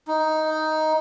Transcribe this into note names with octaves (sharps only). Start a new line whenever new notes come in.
D#4